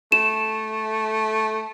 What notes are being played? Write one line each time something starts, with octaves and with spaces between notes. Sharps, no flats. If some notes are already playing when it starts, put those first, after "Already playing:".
A3 E7